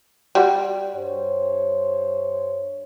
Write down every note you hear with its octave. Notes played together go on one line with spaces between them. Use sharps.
G3 F#4
G2 C5 C#5